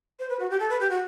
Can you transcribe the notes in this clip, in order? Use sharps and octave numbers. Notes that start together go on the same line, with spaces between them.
C5
B4
F#4
G4
A4
B4
G4
F#4